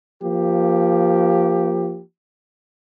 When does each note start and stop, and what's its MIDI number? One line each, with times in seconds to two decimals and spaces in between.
0.21 2.00 53
0.21 2.00 58
0.21 2.00 67